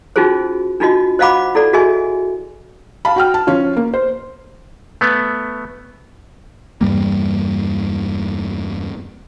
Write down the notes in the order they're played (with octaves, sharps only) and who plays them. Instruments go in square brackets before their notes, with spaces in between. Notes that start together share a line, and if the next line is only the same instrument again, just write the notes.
[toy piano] C#4 D#4 F4 F#4 G#4 C5
D4 D#4 F4 F#4 D#5
C5 D#5 F5 F#5 B5 D6
E4 A4 D5
F#4 G#4 D#5 E5 G#5
[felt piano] F5 A5 B5
F#4 G5 F6
A5
F3 C#4 F4
A#3
C5
[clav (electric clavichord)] A3 B3
[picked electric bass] E2 G2 G3 A#3